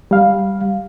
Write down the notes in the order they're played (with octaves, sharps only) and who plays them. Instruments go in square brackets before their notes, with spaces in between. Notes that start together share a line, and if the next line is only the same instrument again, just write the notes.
[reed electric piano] G3 F5